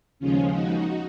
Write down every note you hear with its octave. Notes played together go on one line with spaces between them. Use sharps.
D#2 C#3 F3 G#3 C#4 F4
D#4 F#4